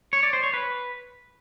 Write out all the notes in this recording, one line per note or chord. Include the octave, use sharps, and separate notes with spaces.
C#5
D5
C5
C#5
B4